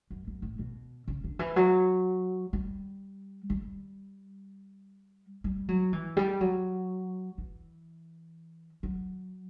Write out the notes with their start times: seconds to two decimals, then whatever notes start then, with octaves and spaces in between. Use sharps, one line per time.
0.10 F#2
0.27 F#2
0.42 A2
0.59 B2
1.08 C#3
1.24 D3
1.39 E3
1.56 F#3
2.53 G3
3.50 G3
5.44 G3
5.68 F#3
5.93 E3
6.17 G3
6.41 F#3
7.38 E3
8.83 F#3